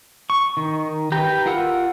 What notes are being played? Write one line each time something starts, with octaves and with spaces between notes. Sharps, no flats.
C#6
D#3
G4 B4 G5 A#5
F4 A#4 F#5 E6